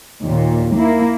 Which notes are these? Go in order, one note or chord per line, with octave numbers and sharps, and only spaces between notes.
D#2 A#2
A#3 E4